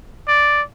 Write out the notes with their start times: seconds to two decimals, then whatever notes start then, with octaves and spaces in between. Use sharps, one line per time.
0.28 D5